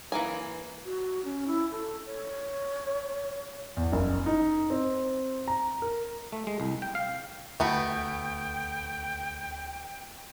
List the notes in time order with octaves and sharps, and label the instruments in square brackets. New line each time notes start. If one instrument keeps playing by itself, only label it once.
[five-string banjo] E3 A#3 G#5
[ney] F#4
C#4
E4
A4
C#5
[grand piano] E2
F#1
D#4
C4
A#5
A#4
[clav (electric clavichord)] A3
G#3
C2
G5
F5
[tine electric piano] D2 [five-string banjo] A3 B3 F#4 [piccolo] G5